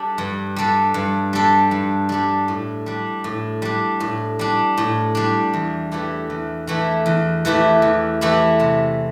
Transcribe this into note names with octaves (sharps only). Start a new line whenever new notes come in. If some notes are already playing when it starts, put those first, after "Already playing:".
Already playing: G3 D4 A4
G2
G3 D4 A4
G2
G3 D4 A4
G2
G3 D4 A4
A2
G3 D4
A2
G3 D4
A2
G3 D4
A2
G3 D4
E2
E3 A3 E4 G4
E2
E3 A3 E4 G4
E2
E3 A3 E4 G4
E2
E3 A3 E4 G4
C3